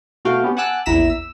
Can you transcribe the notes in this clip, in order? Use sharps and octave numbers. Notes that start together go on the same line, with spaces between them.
B2 A3 F#4 F5 G5
B3 C#4 G4
F#5 G#5 A5 D6 E6 F#6
A#1 E2 E4 A#5 B6 E7
E6